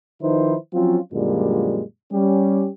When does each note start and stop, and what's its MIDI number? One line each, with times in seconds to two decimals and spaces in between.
0.22 0.56 51
0.22 0.56 53
0.22 0.56 63
0.22 0.56 64
0.22 0.56 71
0.22 0.56 72
0.74 0.98 53
0.74 0.98 54
0.74 0.98 60
0.74 0.98 61
0.74 0.98 65
1.13 1.82 42
1.13 1.82 46
1.13 1.82 50
1.13 1.82 53
1.13 1.82 55
1.13 1.82 56
2.12 2.69 55
2.12 2.69 61
2.12 2.69 67